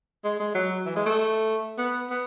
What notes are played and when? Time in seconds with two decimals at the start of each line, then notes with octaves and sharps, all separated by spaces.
0.24 G#3
0.39 G#3
0.54 F#3
0.86 E3
0.96 G#3
1.06 A3
1.78 B3
2.10 B3